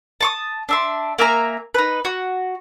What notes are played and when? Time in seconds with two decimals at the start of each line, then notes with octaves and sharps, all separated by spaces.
0.21 A5 C#6 D#6
0.69 D4 E5 C6
1.18 A#3 E5 G#5 A#5
1.74 D#4 B4
2.05 F#4